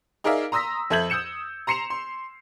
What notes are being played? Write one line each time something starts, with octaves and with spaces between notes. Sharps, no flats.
D#4 G#4 A#4 D5 E5 F5
A#5 C6 D#6 E6 A#6 B6
F2 A4 E5 G6 G#6 F#7
D#6 E6 G6 C#7 E7
A#5 C6 C7 C#7 E7 F7
C6